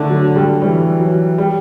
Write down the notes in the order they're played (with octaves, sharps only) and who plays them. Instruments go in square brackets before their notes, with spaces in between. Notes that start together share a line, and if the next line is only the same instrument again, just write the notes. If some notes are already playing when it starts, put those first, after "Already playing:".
Already playing: [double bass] D3 [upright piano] A3
[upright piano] F#3
G3
[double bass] E3 [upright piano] G3
[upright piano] F#3
G3